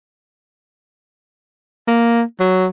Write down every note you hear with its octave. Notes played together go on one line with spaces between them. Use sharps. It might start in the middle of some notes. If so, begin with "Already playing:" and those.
A#3
F#3